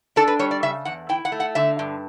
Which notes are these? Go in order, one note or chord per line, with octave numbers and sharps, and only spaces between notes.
D4 A4
B4
G3 C#5
D5
C#3 E5
E2 F#5
E4 G5
F#5
A3
F#5
D3 E5
G2